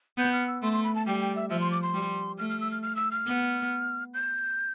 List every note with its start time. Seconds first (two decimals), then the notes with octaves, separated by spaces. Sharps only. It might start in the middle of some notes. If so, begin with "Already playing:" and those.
0.17 B3 G6
0.33 F6
0.47 E6
0.62 A3 C6
0.73 C6
0.84 B5
0.95 A5
1.07 G3 G5
1.20 G5
1.36 E5
1.50 F3 E5
1.61 C6
1.72 D6
1.83 C6
1.94 G3
2.38 A3 F6
2.49 F6
2.60 E6
2.71 F6
2.82 F6
2.96 E6
3.11 F6
3.26 B3
4.14 G6